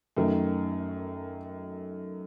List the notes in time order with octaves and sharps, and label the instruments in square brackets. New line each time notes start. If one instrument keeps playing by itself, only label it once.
[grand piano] F#2 D#3 A3